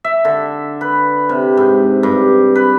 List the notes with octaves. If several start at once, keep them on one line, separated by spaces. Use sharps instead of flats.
E5
D3
B4
C3
G#2
G2
B4